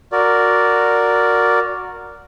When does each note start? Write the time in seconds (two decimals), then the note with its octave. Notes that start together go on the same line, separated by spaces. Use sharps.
0.12 F#4 A#4 D5